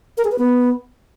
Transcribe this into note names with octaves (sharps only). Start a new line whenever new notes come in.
A#4
G#4
B4
B3